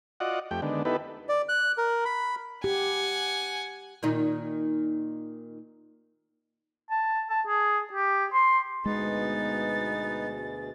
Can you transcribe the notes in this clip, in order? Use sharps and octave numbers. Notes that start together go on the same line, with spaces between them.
F4 F#4 D5 D#5 F#5
F2 A3 G4 G5
D3 D#3 G#3 B3 D4
B3 D#4 E4 G4 A4 B4
D5
F#6
A#4
B5
G4 F#5 G#5
A#2 D#3 D#4
A5
A5
G#4
G4
C6
D2 B2 G#3 B3 D#4 G#4 A6